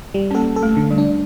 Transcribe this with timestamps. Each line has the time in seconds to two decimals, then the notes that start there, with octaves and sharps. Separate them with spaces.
0.14 G3
0.31 C#4
0.35 A#3 A4
0.56 A4
0.63 A3
0.76 D3
0.91 G3
0.98 D4